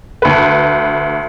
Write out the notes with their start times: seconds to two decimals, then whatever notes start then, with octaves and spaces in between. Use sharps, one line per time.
0.22 D2 B4